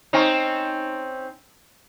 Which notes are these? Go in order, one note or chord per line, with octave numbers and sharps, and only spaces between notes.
C4 C#4 D#4